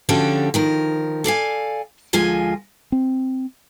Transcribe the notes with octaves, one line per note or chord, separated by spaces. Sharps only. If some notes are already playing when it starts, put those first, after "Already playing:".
D3 F3 C#4 F#4 G4 A4
D#3 F3 A#4
A4 D5 F5 G#5
D2 F3 G#3 F4 G#5
C4